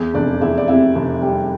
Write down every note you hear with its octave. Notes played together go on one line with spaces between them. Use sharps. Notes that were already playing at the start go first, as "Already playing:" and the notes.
Already playing: E2
F1 D4 D5
E2 E4 E5
D5
C3 E4 E5
F1
G3